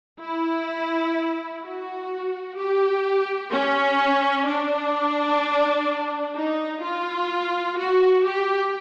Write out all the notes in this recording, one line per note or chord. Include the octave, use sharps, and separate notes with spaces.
E4
F#4
G4
C#4
D4
D#4
F4
F#4
G4